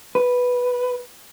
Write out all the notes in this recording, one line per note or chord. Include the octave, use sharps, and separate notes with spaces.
B4